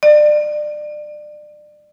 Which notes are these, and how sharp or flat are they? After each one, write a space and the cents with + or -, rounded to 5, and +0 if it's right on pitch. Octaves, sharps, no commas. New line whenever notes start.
D5 +25